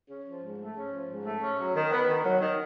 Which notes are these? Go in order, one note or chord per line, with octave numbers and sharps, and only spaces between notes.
C#4
F3
G#2
A3
C#4
F3
G#2
A3
C#4
F#3
D#3
B3
D#3
F#3
D#3